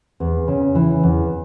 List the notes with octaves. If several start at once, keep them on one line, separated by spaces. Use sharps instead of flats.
E2
C#3
E3
E2